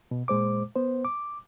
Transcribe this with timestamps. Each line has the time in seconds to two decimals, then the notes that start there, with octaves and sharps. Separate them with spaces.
0.11 B2
0.28 A#2 G#3 C5 D6
0.76 B3 C5
1.05 D6